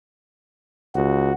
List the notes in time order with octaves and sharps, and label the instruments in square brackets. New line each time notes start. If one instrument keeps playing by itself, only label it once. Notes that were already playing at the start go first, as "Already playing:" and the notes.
[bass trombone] C#2 [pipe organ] F#4